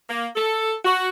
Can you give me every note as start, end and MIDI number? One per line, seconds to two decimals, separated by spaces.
0.09 0.27 58
0.36 0.74 69
0.85 1.09 66